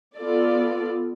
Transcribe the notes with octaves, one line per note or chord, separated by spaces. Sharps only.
B3 F4 A4 D5